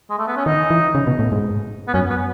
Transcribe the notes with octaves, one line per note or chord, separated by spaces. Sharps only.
G#3
A3
B3
C#4
D#3 D#4
E3
C#3
B2
A2
G#2
B3
F#2 C#4
B3